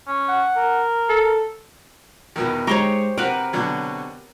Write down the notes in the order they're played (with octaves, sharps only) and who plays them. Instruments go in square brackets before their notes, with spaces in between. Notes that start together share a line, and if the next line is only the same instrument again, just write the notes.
[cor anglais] C#4
[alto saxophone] F#5
[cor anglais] A#4
[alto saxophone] A4
[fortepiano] E2 B2 D#3
[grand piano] G#3 [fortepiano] D#4 A#5 C#6 [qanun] G4 C5 C#5
[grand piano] C3 [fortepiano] C4 F#4 [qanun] A#4 B4
[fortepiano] B2 D3 F#3